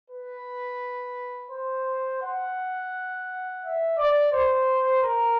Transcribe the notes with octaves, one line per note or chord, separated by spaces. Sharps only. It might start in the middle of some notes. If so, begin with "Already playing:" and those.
B4
C5
F#5
E5
D5
C5
A#4